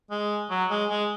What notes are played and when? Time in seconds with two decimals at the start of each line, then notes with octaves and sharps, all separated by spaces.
0.11 G#3
0.51 F#3
0.71 G#3
0.90 G#3